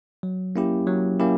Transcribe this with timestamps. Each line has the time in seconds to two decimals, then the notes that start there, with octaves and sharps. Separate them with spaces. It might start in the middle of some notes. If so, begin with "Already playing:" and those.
0.23 F#3
0.56 A#3 C#4 E4 G4
0.87 F#3
1.20 A#3 C#4 E4 G4